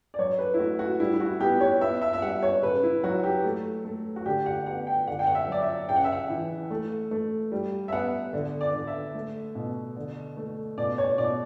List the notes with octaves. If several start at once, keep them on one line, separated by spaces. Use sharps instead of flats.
D5
F#3 C#5
B4
E4
A3 F#4
F#4
G3 E4
E4
F#4
B3 G4
C#5
B3 E5
E5
E5
G3 F#5
C#5
C#3 B4
E4
F#3 F#4
G4
A3
A3
F#4
D3 G4
F#5
B3 F#5
G5
D3 F#5
G5
F#5
E5
F#3 D5
E5
C#3 G5
F#5
E5
F#5
E3
A3
A3
G3
E5
B3 F#5
D3
D5
D3
E5
A3
B2
D3
A3
B2 D5
C#5
B2 D5